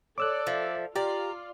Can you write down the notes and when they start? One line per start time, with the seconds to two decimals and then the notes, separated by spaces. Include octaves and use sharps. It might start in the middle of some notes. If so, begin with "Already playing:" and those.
0.18 A4 C#5 D5 D6 E6 F#6
0.47 F3 E5
0.96 F4 G4 D5 A#5